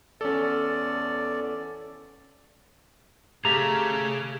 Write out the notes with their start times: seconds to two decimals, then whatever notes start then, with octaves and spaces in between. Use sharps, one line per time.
0.21 E2 C#4 A4 D5
3.45 A3 G4 G#4 F5 A#5